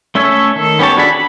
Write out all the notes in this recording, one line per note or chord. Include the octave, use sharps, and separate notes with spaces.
A3 C#4 A4 C#5 E5
D#3 A4
B3 C#4 G4 C#5 A5
D4 F#4 G#4 A4 B5
B5